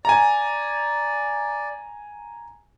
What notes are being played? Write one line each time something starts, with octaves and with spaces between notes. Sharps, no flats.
D5 G#5 A#5